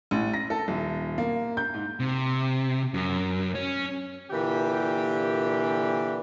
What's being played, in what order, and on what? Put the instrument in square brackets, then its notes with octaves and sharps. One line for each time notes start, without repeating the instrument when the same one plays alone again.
[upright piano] A1
A#6
A4
D#1
A#3
G6
G#2
[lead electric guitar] C3
F#2
C#4
[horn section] A#2 D3 E3 G4